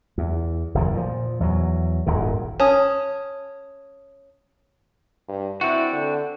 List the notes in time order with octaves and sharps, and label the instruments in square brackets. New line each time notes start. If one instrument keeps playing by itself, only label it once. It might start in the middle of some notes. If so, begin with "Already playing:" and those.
[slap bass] E2
F#1 E2 D#3
A#2 F3
E2 F#3
D#1 G#1 F#2 D#3
[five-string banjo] C#4 [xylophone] A5 D#6
[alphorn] G2
[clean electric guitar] C4 D4 F#4 [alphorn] E4
[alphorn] D3